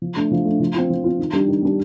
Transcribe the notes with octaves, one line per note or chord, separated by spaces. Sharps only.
F3
A3 D4
F3
A3 D4
F3
C4 F4
F3
C4 F4
D#3
G3 D4 G4
D#3
G3 D4 G4